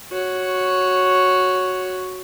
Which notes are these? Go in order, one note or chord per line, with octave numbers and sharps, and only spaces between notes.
F#4 C#5